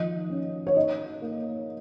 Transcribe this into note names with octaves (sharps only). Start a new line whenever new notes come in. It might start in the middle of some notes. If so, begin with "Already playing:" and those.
Already playing: D#3 F3 D#5
C#4
C#5
D#4 D#5
A#3